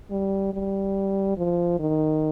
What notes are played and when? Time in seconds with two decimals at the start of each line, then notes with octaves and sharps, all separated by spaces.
0.10 G3
0.53 G3
1.37 F3
1.79 D#3